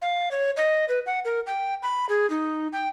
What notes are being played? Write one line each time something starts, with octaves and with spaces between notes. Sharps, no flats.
F5
C#5
D#5
B4
F#5
A#4
G5
B5
G#4
D#4
G5